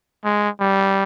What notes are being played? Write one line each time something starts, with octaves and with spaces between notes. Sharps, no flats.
G#3
G3